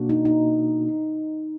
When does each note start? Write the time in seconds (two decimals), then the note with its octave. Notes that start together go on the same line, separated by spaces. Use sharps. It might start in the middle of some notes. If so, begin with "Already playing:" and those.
Already playing: B2 A#3 D4 F#4
0.09 D#4
0.25 D#4